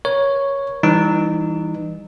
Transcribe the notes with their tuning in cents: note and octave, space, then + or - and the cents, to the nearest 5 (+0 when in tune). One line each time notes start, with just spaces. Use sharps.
A#4 +35 C#5 +0
E3 +0 G3 +25 D#4 -30